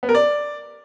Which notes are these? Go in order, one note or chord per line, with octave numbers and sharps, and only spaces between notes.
B3
A#4
D5